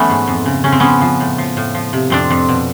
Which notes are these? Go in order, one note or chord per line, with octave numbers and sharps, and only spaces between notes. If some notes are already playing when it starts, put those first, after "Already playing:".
Already playing: E3 A3 B3 C#4
G#2
F2
C#3
C#3 C#4
C4
F3 B3 C#4
F3
A2
F3
A2
F3
C3
F2 C4 D4
F2
B2